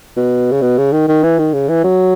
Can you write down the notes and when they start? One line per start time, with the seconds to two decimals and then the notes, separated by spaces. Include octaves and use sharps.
0.17 B2
0.52 C#3
0.62 B2
0.78 C#3
0.93 D#3
1.08 D#3
1.23 E3
1.39 D#3
1.53 C#3
1.69 E3
1.84 F#3